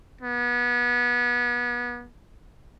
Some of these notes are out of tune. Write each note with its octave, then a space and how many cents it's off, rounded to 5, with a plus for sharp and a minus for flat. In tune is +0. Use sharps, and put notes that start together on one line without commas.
B3 -30